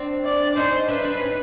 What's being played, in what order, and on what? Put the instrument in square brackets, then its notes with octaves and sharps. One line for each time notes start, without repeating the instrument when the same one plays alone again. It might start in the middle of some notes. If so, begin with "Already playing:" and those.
Already playing: [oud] C4 D4
[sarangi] D5
[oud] C#4 D#4 [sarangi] C5
[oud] D4 E4 [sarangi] B4
[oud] C4 D4
C#4 D#4